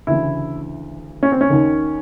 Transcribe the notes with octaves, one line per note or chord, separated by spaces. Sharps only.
D2 C#3 E3 E4
C#4
C4
C#4
D#2 D#3